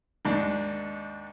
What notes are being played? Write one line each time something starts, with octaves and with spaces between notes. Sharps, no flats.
D#2 G#2 D4